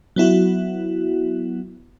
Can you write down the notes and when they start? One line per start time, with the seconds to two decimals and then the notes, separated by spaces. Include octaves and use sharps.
0.16 F#3 B3 E4 F#4